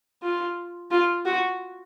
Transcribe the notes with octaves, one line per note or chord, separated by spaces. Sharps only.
F4
F4
F#4